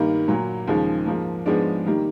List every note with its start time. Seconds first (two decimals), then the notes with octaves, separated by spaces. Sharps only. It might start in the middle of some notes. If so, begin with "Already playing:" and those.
Already playing: G2 D#3 G3 A#3
0.28 A#2 F#3 A#3
0.68 D#2 C#3 F3 G#3
1.06 G#2 F3 A#3
1.46 G#2 F3 G#3 B3 D4
1.86 D#3 G3 A#3